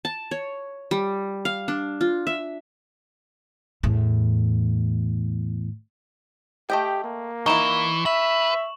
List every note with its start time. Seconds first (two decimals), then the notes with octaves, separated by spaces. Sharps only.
0.05 A5
0.31 C#5
0.91 G3
1.45 F5
1.68 D4
2.01 F4
2.27 E5
3.83 E2 A2
6.70 A3 G4 D#5 G5
7.04 A#3
7.46 E3 D#4 E4 C#6 E7
8.06 B4 E5 F#7